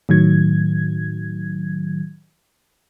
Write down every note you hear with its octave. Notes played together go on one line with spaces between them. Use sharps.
A2 D#3 F#3 G#6